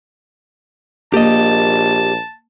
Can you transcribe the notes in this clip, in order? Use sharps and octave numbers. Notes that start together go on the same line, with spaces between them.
A#1 A#3 G4 D#5 A5